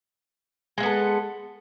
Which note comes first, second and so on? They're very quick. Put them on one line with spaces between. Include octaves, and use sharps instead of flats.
G#3 A#3 B3 A4